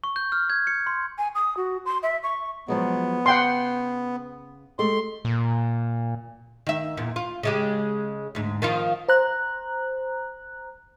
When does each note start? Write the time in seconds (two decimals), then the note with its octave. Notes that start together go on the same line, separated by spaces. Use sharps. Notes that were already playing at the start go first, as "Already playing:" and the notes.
0.04 C#6
0.16 G6
0.32 F6
0.50 G#6
0.67 C#7
0.87 C6
1.18 G#5
1.35 D#6
1.57 F#4
1.85 C6
2.03 E5
2.23 C#6
2.68 F3 F#3 G#3 B3
3.26 C#3 F#5 G5 C6
4.79 G#3 A3 G4 C6
5.25 A#2
6.67 D#3 E5
6.97 E2 A#2
7.16 F4
7.43 C#3 G#3 G4
8.35 D2 G#2
8.62 D#3 F3 F4
9.08 C5 A#5 F#6